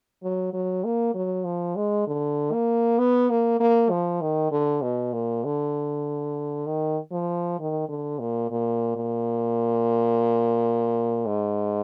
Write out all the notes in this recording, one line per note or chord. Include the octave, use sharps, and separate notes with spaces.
F#3
F#3
A#3
F#3
F3
G#3
D3
A#3
B3
A#3
A#3
F3
D#3
D3
B2
A#2
D3
D#3
F3
D#3
D3
A#2
A#2
A#2
G#2